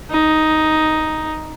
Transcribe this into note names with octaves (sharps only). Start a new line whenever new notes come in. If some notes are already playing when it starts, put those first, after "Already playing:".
D#4